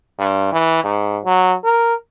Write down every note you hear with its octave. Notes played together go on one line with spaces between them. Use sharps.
G2
E3
G#2
F#3
A#4